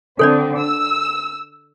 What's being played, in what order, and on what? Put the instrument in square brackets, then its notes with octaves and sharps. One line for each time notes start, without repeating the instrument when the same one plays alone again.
[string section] D3 C4 [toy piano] A4 C#5 D5
[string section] E6